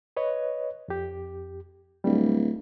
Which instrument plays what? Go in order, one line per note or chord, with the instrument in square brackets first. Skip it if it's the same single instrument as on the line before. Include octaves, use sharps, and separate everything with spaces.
[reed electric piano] B4 C#5 D#5
F2 G4
[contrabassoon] D1 [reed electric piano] G3